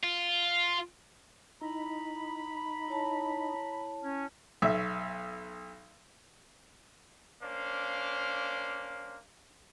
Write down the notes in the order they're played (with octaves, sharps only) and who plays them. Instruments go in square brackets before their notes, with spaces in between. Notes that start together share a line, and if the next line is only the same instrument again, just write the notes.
[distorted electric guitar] F4
[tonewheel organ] D#4 [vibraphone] E4 [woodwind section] A#5 B5
[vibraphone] E4 C#5 A5
[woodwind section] C#4
[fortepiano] B1 E5
[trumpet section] A#3 C#4 D4 C5 F5